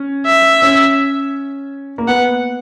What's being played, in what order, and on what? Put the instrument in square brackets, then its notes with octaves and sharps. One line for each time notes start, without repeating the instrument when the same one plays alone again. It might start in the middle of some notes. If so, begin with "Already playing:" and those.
Already playing: [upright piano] C#4
[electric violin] E5
[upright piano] C#4
A#3
[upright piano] B3 [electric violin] F#5